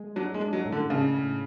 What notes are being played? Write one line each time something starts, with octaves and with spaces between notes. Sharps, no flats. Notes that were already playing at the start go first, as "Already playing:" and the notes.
Already playing: G#3
F#3 D4
G#3
D4
F#3
A2
D3
C#3 D4
A2